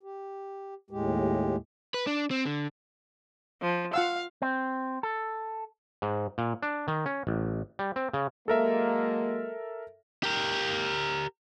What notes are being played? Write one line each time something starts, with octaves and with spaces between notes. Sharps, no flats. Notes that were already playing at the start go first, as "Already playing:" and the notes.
G4
D#2 A2 G#3 G4
B4
D4
C4
D3
F3
F4 F5 F#5 E6
C4
A4
G#2
A#2
D4
D#3
C#4
A1
G3
C4
C#3
F#3 G#3 A#3 A4 A#4 E5
G4 A#4